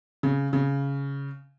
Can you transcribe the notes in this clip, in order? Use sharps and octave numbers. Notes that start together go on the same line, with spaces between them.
C#3
C#3